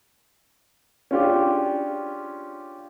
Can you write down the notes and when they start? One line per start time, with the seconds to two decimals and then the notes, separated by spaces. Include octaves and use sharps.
1.11 C#4 D4 F4 G4 G#4